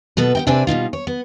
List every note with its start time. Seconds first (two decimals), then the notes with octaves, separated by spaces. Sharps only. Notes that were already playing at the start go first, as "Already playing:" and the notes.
0.17 B2 B3 A4 B4
0.35 B3 D#5 G5
0.47 C3 C4 D4 B4 D5 G#5
0.67 B2 G3 D#4 F4
0.93 C#5
1.07 B3